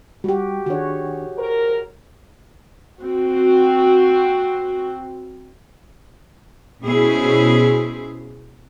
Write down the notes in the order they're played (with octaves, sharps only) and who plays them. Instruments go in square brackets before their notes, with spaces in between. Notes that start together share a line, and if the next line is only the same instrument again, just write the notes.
[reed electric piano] G3 [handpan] F#4 G4
[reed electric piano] D#3 D4 [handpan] F#4 G#4 C#5
[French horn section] A#4 [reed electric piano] C5
[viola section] C4 F#4
[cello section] B2 C#4 E4 G#4 C5